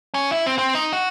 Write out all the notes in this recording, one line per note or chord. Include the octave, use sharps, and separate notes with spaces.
C#4
E4
C4
C4
D#4
F#4